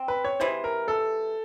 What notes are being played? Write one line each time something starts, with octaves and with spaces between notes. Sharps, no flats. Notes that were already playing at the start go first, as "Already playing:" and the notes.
Already playing: C4
B4
C#5
C3 E3 G#3 C5
A#4
A4